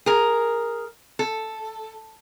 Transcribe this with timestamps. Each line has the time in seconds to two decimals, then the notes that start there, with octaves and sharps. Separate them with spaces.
0.06 G#4 A#4
1.19 A4